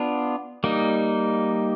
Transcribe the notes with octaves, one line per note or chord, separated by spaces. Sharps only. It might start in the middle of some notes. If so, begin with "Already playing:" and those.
Already playing: B3 D4 F4
G3 A#3 D#4